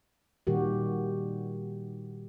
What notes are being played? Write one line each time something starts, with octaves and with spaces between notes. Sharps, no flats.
A#2 D#3 G3 F#4 G4